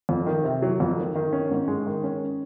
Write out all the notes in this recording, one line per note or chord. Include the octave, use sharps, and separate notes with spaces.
F2
D#3
C3
F#3
F2
D#3
D#3
C#4
G#2
G#3
D#3
C#4